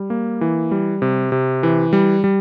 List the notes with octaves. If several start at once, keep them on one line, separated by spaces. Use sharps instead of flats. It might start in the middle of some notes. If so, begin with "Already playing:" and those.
Already playing: G3
A#3
E3
G3
C3
C3
E3
G3
G3